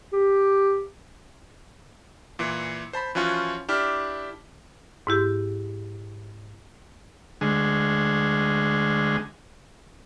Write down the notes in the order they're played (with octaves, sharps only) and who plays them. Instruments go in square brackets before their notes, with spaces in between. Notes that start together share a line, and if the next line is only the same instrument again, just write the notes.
[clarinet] G4
[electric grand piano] A#2 E3
C5 A5 B5
E3 F3 C#4 F4 F#4
D4 E4 G4 F6
[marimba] G#2 E4 G4
[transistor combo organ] D2 G#3